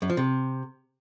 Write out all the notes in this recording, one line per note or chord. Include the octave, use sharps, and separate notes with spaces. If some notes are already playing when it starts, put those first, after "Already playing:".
F#2
F3
C3